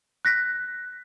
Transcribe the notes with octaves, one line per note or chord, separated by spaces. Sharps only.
F#6 A#6 B6